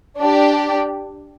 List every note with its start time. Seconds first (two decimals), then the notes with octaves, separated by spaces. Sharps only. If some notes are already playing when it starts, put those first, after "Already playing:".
0.18 D4 G4 D5